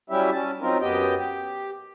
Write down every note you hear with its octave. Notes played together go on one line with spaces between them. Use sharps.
F#3 G3 C#4 E4 G4 E5
C#4 A5
F#3 C4 D#4 F4 A#4
F#2 B3 G4 D#5 G5
G4